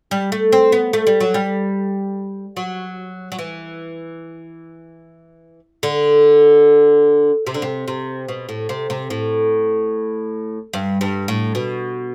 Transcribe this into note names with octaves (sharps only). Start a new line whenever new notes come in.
G3
A3
C4
B3
A3
G3
F#3
G3
F#3
F#3
E3
D3
C3
D3
C3
C3
B2
A2
C3
C3
A2
G2
G2
A2
B2